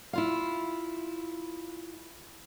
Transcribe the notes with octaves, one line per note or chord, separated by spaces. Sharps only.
E4 F4 F5